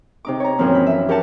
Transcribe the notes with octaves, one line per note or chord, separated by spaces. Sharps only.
C3 D#4 D6
C#5 A#5
F#2 A#2 E3 F3 C4 D#4
B5
E5
G4 A#4 C#5 F#5 A5